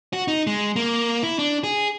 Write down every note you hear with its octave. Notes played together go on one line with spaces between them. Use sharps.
F#4
D#4
G#3
A#3
E4
D4
G#4